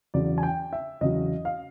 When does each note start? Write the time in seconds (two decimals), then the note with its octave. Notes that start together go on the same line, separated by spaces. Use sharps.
0.14 E2 C#3 F#3 D5
0.38 G#5
0.43 G5
0.73 E5
1.01 E2 C#3 F#3 D#5
1.45 F5